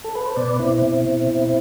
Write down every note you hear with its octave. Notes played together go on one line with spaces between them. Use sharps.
A4
B4
C5
B2 B4 D5
B2 C4 E4
B2
B2
B2